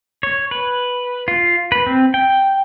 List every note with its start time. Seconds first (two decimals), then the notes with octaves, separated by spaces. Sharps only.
0.23 C#5
0.51 B4
1.28 F4
1.72 B4
1.86 C4
2.14 G5